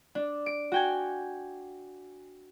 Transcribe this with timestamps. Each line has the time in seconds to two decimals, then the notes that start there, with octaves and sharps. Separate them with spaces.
0.15 D4
0.46 D7
0.72 F#4 G5 G#5